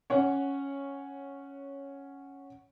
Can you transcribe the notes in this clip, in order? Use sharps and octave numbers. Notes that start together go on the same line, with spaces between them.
C#4 C#5 F#5